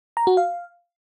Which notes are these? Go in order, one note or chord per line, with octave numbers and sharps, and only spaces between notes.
A#5
F#4
F5